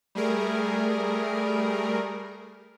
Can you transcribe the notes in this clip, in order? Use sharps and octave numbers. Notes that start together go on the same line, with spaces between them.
G3 A3 G#4 A#4